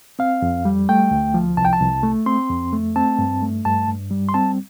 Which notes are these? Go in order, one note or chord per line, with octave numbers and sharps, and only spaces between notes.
C4 F5
F2
G3
A3 G5
D2
F3
C2 A5
G5
A5
C2
A3
C4 C6
F2
A3
C4 A5
G2
A3
G2 A5
G2
G3
C6
C4 A5